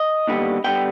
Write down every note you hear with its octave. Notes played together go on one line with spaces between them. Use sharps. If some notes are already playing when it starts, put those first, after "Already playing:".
Already playing: D#5
D#2 D3 G3 B3
D3 G3 B3 G5